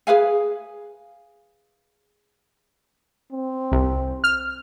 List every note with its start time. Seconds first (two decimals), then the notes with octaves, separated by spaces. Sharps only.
0.07 G#4 B4 F5 G#5
3.32 C4
3.72 C2
4.24 F6